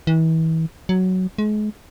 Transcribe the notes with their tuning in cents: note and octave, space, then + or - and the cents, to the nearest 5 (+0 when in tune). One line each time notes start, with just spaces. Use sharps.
E3 -35
F#3 +5
G#3 +35